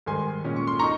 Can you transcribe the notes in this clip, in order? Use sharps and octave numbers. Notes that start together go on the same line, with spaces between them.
G#2 D#3 G3 G#5 C6
A#2 G#3 C#4
C#6
C6
D#4 A#5 C#6